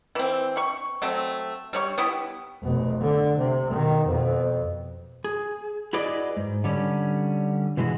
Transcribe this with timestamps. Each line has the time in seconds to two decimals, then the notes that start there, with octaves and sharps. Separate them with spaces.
0.15 E3 C4
0.57 C#6
1.02 F#3 A3 C4
1.73 G3 C#5 C#6
1.98 B3 E4 G4
2.63 F1 B2
3.01 D3
3.38 C3
3.70 B2 D#3
4.06 F2 B2
5.24 G#4
5.93 E4 F#4 G#4 B4 D5 D#5
6.37 G#2
6.64 D3 G3 C#4
7.77 B2 E3 G#3 F#4